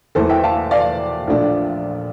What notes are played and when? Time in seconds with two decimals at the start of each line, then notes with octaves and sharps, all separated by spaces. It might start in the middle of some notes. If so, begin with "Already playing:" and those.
0.15 E2 E3 A3 A4 C5
0.29 E5 G5
0.44 F5 A5
0.71 D5 F5
1.27 A#1 A#2 A3 D4